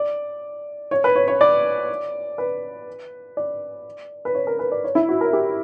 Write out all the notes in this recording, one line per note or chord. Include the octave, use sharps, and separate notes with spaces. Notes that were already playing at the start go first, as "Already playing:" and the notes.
Already playing: D5
C#5
B4
C#5
C#5
D5
B4
D5
B4
C#5
A#4
B4
D5
C#5
E4
F#4
A#4
G4